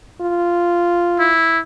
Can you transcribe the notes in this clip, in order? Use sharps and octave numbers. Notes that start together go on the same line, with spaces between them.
F4
E4